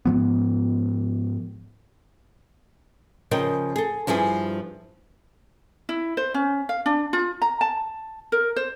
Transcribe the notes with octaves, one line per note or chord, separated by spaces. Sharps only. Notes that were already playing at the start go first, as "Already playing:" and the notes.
G#2 F3 B3
C#3 F3 G#4 A#4 D#5 G5
G#4 A4
G2 F3 E4 G#4 G#5
E4
C5
C#4
F5
D4
F4
A#5
A5
A#4
C5